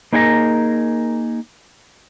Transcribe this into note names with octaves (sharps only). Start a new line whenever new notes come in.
A#3 D#4 G#4 A#4 F#5 A#5